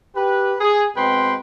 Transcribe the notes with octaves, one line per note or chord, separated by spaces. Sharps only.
G4 B4
G#4
B2 G#3 C4 B4 G5 C6